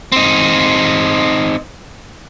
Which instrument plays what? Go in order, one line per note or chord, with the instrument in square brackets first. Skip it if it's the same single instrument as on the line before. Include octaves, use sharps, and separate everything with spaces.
[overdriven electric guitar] C4 D#4